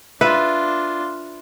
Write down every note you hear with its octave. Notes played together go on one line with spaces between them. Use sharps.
D4 F4 B4 E5